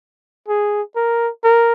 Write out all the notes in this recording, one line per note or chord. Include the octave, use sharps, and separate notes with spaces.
G#4
A#4
A#4